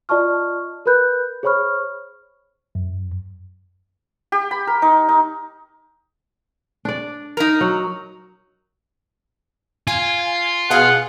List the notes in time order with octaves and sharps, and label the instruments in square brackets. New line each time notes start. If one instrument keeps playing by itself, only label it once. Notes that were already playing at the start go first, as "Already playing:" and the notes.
[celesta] F4 D5 D#5 A5 C#6 F6
A#4 B4 B5 F#6 G6
G#4 C5 C#5 B5 C#6 F6
[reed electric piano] F#2
[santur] G4
B5
A#4
D#4
D#4
[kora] D4 D5
[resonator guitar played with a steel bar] D#4 A#4
[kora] F#3
[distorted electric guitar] F4 [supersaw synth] G#5
[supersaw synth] B2 G#4 F5 [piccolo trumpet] F#5